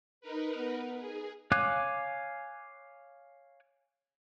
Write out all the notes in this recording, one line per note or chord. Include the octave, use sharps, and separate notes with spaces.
D#4 A#4 B4
B3
G#4
C#5 F5 G#5 D6 F#6